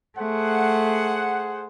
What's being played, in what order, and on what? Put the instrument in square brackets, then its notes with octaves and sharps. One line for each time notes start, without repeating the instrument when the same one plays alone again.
[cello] A3 [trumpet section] G#4 C5 F#5